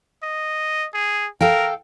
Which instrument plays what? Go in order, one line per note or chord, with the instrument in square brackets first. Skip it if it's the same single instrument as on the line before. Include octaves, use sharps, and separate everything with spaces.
[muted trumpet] D#5
G#4
[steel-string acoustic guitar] A4 F5 G5 [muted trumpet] A#4